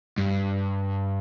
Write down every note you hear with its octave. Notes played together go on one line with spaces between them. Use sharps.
G2